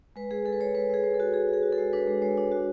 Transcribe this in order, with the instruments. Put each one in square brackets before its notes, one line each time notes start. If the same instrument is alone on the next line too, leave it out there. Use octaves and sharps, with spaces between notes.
[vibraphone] G#3 B4
G#3 G#4
G#3 A4
B4
G#3 C#5
G#3 B4
G#3 G#4
G#3
A4
F#4
F#4 G#4
F#4
G#4
F#4
A4
G#3
D4 B4
G#3
G#3 C#5
D4
F#4